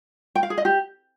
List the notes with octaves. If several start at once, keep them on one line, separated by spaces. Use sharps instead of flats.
G5
F5
G#4
D#5
G4